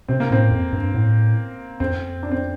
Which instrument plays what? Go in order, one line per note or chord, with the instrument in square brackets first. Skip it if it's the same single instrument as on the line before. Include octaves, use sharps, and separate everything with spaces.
[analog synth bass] C3 [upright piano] C4
[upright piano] A#3
[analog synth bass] A2 [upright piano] C4
[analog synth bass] F2
G2
A2
[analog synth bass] F2 [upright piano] C4
[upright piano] D4
C4